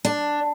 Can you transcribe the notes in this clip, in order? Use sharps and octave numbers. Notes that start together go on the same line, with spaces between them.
D4